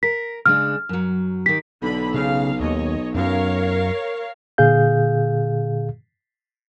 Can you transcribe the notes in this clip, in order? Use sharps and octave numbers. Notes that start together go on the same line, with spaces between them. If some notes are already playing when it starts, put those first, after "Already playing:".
A#4 B6
C#3 G#3 D4 F6
F#2 F#3
D#3 G4 B6
B1 D3 B5
C#3 F5
D#2 C#5 D#5
F#2 A#4 C#5 F5
A#2 D3 G#4 F5 G6